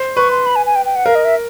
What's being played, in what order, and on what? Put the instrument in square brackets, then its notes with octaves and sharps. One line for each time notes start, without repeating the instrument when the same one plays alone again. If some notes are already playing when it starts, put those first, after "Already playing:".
Already playing: [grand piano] C5
[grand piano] B4 [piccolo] C#6
[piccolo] C6
B5
G#5
G#5
G5
G5
F#5
[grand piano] A#4 [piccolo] F5
[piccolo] D#5
E5